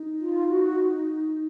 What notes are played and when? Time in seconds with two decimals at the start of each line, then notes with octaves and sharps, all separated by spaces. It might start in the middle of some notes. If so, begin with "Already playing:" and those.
Already playing: D#4
0.19 F4
0.47 F#4